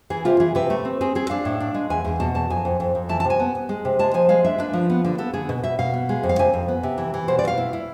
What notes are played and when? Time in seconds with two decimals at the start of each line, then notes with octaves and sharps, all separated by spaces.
0.10 E3 G#4
0.25 C3 F4
0.40 E3 G#4
0.55 C3 B4
0.70 A3
0.85 C4
1.01 C4 G#4
1.15 C4 G#4
1.30 D4 F5
1.45 A2
1.60 D4
1.74 G#3
1.90 E2 G#5
2.05 E2
2.20 B2 A5
2.35 E2 A5
2.50 F2 G#5
2.65 F2
2.80 F2
2.95 F2
3.09 E3 A5
3.20 C3 A5
3.30 G#5
3.40 B3
3.55 B3
3.69 G#3
3.85 C3
3.99 G#3 A5
4.14 F3 G#5
4.29 G#3 F5
4.44 D4 E5
4.58 D4 B4
4.73 F3
4.90 B3
5.05 D3
5.18 B3 A4
5.33 D3 G#4
5.49 B2
5.64 B2 E5
5.79 B2 F5
5.94 B3
6.09 G#3
6.23 F2
6.29 F5
6.39 C3 G#5
6.54 F2
6.68 B3
6.83 C3
6.98 E3
7.14 E3
7.28 B2 C5
7.39 D5
7.44 B2 F5
7.57 E4
7.73 E4